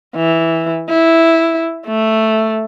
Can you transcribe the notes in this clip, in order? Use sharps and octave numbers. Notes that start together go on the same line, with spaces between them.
E3
E4
A3